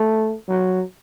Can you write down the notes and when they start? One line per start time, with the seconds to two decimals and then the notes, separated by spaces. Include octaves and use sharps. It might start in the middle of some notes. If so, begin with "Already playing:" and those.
Already playing: A3
0.49 F#3